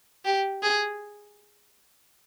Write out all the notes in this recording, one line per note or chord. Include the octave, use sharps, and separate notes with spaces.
G4
G#4